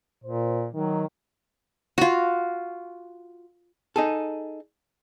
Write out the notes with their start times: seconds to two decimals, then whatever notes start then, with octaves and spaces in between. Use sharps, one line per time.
0.24 A#2 C5
0.74 D#3 F#3
1.98 F4 F#4
3.96 D#4 G#4 A4